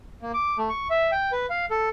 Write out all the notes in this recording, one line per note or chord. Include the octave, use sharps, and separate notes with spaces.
A#3
D6
A3
C#6
E5
G5
B4
F5
A4